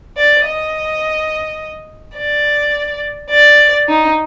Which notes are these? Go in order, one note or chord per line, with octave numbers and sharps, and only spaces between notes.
D5
D#5
D5
D5
D#4